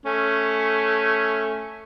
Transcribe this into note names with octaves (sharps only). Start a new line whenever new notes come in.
A3 C#4